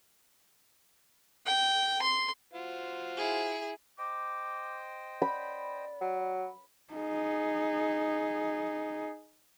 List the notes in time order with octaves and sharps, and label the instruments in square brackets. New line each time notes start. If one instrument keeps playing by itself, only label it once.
[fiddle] G5
C6
[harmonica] F4 F#4 C5
[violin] E4 G#4
[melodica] C5 D#5 G5 [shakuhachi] D6
[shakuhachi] D5 [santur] B5
[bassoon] F#3
[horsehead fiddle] D#4 G#4